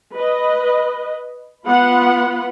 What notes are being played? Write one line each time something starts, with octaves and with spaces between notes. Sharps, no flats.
B4 D#5
B3 F4 F#5 B5